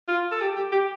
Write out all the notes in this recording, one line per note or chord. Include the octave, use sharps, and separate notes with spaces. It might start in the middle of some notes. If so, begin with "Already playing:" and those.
F4
A4
G4
G4
G4